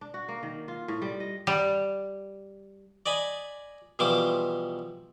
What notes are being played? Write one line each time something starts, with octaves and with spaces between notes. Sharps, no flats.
D4
F#4
A#3
D#3
F4
A2
G3
D#5
G3
D5 D#5 G#5 B5
B2 E3 F3 G3 C6 D6